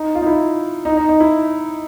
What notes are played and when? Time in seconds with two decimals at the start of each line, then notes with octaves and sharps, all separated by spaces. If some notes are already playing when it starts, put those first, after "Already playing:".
Already playing: D#4
0.15 F4
0.22 D#4
0.26 E4
0.85 D#4
0.97 D#4
1.09 D#4
1.20 E4